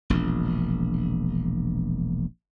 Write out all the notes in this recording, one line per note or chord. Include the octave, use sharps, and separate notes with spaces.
E1 A#1